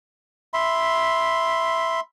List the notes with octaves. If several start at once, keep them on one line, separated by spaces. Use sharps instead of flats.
E5 B5 C6